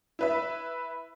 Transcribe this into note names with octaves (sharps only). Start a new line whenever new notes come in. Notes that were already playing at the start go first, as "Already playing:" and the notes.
E4 B4 E5